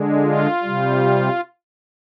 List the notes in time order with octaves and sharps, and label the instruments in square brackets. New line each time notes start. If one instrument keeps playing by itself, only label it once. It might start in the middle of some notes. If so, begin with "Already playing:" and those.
Already playing: [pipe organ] D3 G#3
F4
C3 G3